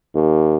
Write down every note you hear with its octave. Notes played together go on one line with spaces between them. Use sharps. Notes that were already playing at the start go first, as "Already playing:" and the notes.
D#2